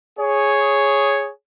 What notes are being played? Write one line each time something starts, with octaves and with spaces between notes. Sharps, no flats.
G#4 C#5